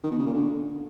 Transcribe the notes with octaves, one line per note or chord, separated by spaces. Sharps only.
D#3
B2
C#3
A#2
D3